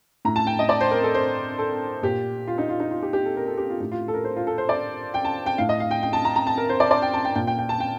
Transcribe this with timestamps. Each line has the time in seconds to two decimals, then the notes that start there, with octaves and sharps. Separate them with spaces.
0.25 A2 A#5
0.36 A5
0.47 G5
0.59 D#5
0.69 D5
0.81 C5
0.91 A#4
1.03 A4
1.15 C5
1.58 A4
2.03 A#2 G4
2.47 F4
2.58 D#4
2.69 F4
2.80 D#4
2.91 F4
3.02 G4
3.13 G4
3.25 A4
3.37 A#4
3.47 A4
3.58 G4
3.70 F4
3.80 A2 G4
3.92 F4
4.08 A4
4.14 A#4
4.25 C5
4.37 F4
4.47 A4
4.58 C5
4.69 D5
5.14 G5
5.25 A5
5.46 G5
5.58 A2 F5
5.69 D#5
5.80 F5
5.91 G5
6.03 G5
6.13 A5
6.25 A#5
6.36 A#5
6.47 A5
6.58 A#4
6.69 C5
6.80 D5
6.91 D5
7.02 G5
7.14 A5
7.25 G5
7.35 A#2 G5
7.47 G5
7.58 G5
7.69 A5
7.80 G5